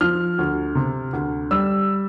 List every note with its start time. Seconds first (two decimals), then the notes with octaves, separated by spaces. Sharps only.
0.01 F3 F6
0.39 D2
0.75 C3
1.13 D2
1.51 G3 E6